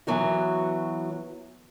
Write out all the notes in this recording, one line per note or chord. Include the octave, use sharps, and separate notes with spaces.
E3 F#3 B3 F#4